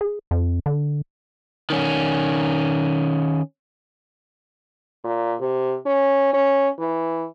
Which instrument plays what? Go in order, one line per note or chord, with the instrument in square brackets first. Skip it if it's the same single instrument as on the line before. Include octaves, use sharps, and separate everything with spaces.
[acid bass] G#4
F2
D3
[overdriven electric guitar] D#3 C#4
[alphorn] A#2
C3
C#4
C#4
E3